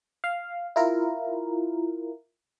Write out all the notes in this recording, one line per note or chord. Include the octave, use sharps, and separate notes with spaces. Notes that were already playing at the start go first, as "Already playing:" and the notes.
F5
E4 F4 A#4